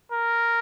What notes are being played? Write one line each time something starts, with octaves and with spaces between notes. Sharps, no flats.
A#4